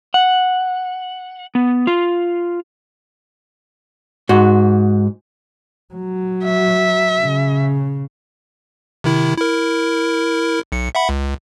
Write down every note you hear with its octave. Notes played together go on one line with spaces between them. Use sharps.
F#5
B3
F4
G#2 F#4
F#3
E5
C#3
C3 D#3 E4
E4 A#4
B1 C#7
E5 F#5 B5
C#2